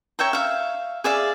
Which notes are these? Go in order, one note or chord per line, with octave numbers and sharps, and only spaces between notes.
C#5 E5 G5 A#5
E5 F5
G#4 D5 E5 F5